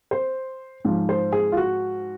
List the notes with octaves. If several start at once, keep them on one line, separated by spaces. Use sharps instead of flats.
C5
G#2 F3
C5
G#4
F4
F#4